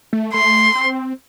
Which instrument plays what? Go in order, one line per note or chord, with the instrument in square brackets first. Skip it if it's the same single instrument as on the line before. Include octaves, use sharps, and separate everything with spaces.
[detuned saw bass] A3
[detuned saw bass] A3 [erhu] C6
[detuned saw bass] C4